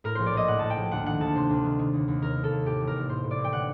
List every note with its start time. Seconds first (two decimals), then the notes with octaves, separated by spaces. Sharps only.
0.04 A2 A#4
0.15 A#1 C5
0.26 D5
0.33 A#1 D#5
0.48 A2 F#5
0.59 A2 A5
0.70 G5
0.77 A#1
0.91 D2 F#5
1.06 D#3 F#5
1.20 D2 A5
1.35 C3 C5
1.50 D2
1.64 D#3
1.79 D#3
1.93 D#2
2.08 D#2
2.22 D#3 A#4
2.37 D#3
2.44 A4
2.51 D#2
2.66 A2 G4
2.81 A1
2.87 A#4
2.95 A1
3.09 A2 C5
3.24 A2
3.31 D5
3.38 A1
3.44 G5
3.53 D3 F#5